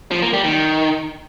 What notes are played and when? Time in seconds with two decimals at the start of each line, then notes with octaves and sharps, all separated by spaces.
0.11 F3
0.22 A#3
0.33 G3
0.44 D#3